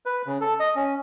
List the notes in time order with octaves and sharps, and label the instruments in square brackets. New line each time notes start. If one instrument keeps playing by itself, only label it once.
[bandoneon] B4
C#3
A4
D#5
C#4